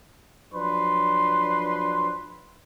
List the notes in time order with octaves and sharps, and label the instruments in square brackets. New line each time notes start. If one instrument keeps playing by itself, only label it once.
[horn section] F3 F#3 D4 B4 C6